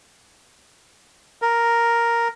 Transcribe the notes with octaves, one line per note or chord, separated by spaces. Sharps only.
A#4